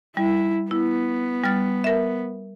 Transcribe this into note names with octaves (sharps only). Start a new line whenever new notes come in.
G3 E4
B3 E4
G3 F6 A6
A#4 E5